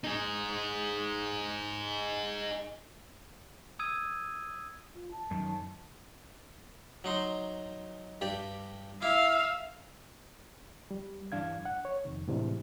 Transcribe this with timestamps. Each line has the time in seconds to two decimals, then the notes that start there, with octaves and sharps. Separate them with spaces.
0.04 D#4 G#4
3.79 D#6 E6 G#6 D#7
4.95 F4
5.12 A5
5.31 F#2 D#3
7.04 F#3 D#4 C6
8.21 G2 G4 D5
9.02 E4 E5 F5 D6
10.91 G3
11.32 G2 E3 D4 F5 G#6
11.65 F#5
11.85 C#5
12.05 F2 C3 D#3
12.28 A2 C3 E3 G#3 D4